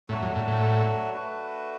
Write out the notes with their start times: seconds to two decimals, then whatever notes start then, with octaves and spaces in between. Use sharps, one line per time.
0.09 A2 F#3 A3 D4 F#4
0.23 F#2
0.36 A2
0.48 A2
1.13 A3 D4 F#4 B4